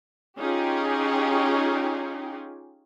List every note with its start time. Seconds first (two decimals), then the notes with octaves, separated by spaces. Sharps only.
0.38 C#4 D#4 F4 G4 G#4